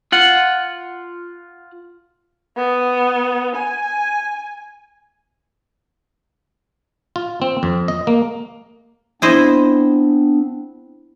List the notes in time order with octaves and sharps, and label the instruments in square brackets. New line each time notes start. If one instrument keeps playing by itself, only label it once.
[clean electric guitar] F4 F#5
[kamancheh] B3
G#5
[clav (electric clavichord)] F4
C4
F2
D#5
A#3
[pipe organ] B3 C4 D4 [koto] E4 C5 D#5